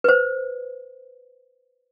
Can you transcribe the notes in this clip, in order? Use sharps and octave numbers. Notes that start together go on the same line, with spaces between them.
B4 C5